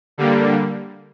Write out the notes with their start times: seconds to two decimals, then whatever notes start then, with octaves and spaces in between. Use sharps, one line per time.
0.18 D3 G3 A#3